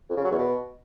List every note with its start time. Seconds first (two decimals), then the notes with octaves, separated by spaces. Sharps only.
0.10 F2
0.17 C#3
0.24 F#3
0.31 E2
0.38 B2